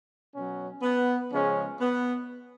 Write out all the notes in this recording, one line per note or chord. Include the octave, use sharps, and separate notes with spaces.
B2 F#3 C#4
B3
C#3 F3 G#3 C#4
B3